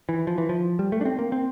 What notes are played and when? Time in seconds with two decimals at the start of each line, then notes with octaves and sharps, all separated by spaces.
0.09 E3
0.27 F3
0.38 E3
0.49 F3
0.79 G3
0.92 A3
1.01 D4
1.05 C4
1.19 A#3
1.32 C4